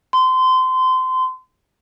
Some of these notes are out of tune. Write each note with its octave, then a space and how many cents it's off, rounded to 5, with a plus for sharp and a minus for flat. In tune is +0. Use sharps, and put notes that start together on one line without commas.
C6 -25